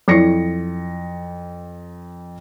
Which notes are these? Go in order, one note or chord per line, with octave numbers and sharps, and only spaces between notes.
F2 F#3 E4 A#6 C#7